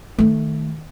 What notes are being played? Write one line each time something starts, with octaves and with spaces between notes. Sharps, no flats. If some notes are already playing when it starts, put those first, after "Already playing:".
D#3 A3